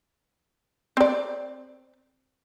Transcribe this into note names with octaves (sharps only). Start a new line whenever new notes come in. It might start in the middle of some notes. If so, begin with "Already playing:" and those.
C4 D5